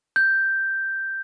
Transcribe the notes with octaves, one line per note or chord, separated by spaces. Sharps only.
G6